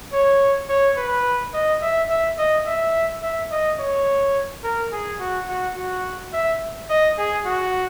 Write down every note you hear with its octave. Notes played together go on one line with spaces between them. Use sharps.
C#5
C#5
B4
D#5
E5
E5
D#5
E5
E5
D#5
C#5
A#4
G#4
F#4
F#4
F#4
E5
D#5
G#4
F#4